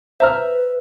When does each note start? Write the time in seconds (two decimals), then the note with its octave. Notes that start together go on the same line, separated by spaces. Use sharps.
0.20 B4 C5 E5 A#5 F6